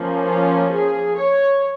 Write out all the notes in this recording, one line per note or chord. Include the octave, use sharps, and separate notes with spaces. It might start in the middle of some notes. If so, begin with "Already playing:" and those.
Already playing: F3 A#3 C#4
F4
G#4
C#5